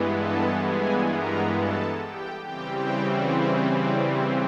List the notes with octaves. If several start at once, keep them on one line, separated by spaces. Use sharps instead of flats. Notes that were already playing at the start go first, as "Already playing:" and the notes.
Already playing: G2 E3 G#3 B3
A4 A5
G#4 G#5
A#4 A#5
A4 A5
G4 G5
C#3 E3 G3 C4 G4 G5
G4 G5
F#4 F#5
D4 D5